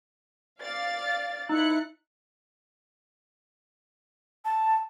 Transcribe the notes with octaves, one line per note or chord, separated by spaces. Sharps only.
D5 F5 A6
D#4 E4 F#6 C#7
A5